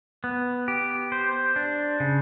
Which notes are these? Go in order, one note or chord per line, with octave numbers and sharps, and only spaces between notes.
B3
G4
C5
D4
C#3